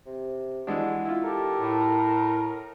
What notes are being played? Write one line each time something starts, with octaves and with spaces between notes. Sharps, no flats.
C3
E3 G#3 D4 F#4
E4 F4
G4 A4 A#4
A2